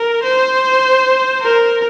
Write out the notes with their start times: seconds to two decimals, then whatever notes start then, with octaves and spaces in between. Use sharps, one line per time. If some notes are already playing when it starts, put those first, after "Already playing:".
Already playing: A#4
0.23 C5
1.42 A#4